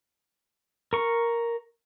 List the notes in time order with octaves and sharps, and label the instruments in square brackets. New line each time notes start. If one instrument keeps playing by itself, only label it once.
[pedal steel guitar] A#4 C#6